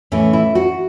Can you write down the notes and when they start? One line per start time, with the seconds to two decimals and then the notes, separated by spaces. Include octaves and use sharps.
0.12 A2 E3 C#4
0.33 E4
0.55 F#4